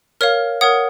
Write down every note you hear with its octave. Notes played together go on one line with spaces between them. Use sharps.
A#4 C#5 F5 F6
A#4 C#5 F#5 D#6